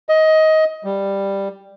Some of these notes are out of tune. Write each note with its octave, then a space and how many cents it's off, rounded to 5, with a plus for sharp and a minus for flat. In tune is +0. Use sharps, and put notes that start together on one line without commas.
D#5 +20
G3 +5